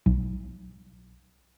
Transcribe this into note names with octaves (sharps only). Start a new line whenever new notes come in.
B1